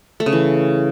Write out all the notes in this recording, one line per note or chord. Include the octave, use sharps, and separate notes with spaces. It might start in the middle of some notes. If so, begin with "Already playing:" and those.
A3
C#3
E3